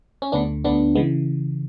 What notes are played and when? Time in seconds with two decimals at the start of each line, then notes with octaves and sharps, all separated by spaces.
0.22 C#4
0.32 D2 D3 B3 D4
0.64 D2 D3 B3 D4
0.95 C#3 E3 G#3 B3